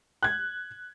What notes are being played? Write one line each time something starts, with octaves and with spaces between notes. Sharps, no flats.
F#6 G#6